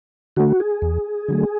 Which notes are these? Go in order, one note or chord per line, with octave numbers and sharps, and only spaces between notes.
D3 A3 F#4
G#4
E2
D3 F#3 A3